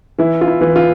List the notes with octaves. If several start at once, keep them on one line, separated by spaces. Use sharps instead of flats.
E3 E4
F4
E4
E3
F4